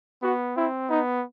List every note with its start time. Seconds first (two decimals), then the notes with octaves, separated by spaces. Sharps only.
0.23 B3 F#4
0.56 C4 E4
0.90 B3 D#4